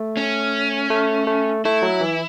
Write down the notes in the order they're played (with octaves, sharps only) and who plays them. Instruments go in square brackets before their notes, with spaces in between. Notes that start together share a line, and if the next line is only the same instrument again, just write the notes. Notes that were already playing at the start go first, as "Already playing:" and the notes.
Already playing: [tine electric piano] A3
[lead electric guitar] C#4
[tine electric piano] A3
A3
[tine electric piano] A3 [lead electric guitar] E4
[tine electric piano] F#3
E3